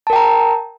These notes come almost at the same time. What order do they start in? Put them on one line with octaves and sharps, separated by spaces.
A5 A#4 G5 A#5